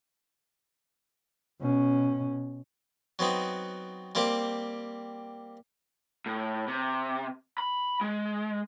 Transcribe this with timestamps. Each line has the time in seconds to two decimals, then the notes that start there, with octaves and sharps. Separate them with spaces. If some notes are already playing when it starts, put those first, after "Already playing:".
1.61 B2 C#4
3.19 F#3 B3 C4 D#4
4.15 G3 A#3 C4 G4
6.26 A2
6.68 C3
7.58 B5
8.01 G#3